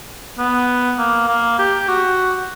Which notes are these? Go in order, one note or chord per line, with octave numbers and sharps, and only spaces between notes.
B3
A#3
A#3
G4
F#4